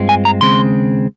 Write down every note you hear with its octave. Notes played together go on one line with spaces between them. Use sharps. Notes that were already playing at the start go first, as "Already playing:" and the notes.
Already playing: G2 G#3 C4 F4
G#5
A#5
D#2 C#3 G#3 C4 C6